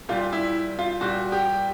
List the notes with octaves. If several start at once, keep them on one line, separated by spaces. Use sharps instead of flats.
A#2 G3 F4
E4
F4
A#2 G3 F#4
G4